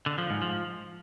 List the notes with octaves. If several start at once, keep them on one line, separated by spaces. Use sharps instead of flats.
D3
F3
G#2
F3